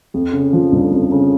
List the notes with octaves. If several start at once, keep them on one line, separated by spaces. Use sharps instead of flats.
F2
C#3
F3
G1
F2
C#3